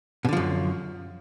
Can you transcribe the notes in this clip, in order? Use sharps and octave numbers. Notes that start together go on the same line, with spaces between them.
F#2 B2 D3 F3